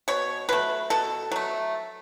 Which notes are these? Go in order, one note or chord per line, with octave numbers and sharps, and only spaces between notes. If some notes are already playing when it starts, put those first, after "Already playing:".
B2 C#5
F#3 A3 B4
B2 A4
F#3 A3